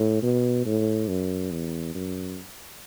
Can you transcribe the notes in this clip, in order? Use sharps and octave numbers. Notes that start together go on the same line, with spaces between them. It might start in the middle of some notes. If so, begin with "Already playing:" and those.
Already playing: A2
B2
A2
F#2
E2
F#2